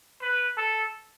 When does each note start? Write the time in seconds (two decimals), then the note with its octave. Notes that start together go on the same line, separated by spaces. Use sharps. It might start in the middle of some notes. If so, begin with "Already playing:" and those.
0.22 B4
0.57 A4